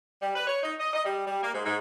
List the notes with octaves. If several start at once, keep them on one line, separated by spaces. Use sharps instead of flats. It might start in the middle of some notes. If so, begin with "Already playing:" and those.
G3
B4
C#5
D#4
D#5
D#5
G3
G3
A#3
G#2
G#2